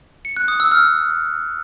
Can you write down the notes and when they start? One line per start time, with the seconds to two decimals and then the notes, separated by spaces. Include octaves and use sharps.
0.25 C#7
0.37 F#6
0.48 D#6
0.60 E6
0.72 F6